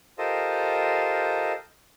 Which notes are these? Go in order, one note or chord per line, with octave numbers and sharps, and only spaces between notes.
F4 G4 A4 A#4 C5 D#5